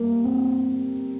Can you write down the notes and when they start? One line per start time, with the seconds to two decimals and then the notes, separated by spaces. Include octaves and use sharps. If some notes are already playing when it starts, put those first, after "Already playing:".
Already playing: G3 A#3
0.24 C4